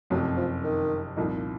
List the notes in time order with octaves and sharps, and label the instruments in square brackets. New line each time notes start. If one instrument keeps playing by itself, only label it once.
[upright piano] F#1 F2 C3 [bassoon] F#3
[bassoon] F3
D#3
[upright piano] C2 A#2 F3 A#3 D#4